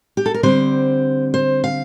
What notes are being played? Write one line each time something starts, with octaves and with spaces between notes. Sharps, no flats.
G4
A4
A#4
D3 G3 C4 C5
C5
F5